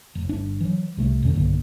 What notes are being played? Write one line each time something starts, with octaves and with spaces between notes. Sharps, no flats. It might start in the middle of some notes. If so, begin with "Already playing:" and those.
F1
G1 D4
E3 F#3
C2 C3 A3
E2 B2 D3 C#4
B1 G2 D3 A#3